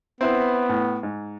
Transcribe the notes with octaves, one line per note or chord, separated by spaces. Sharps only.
B3 C4 E4 B4
A2
G#2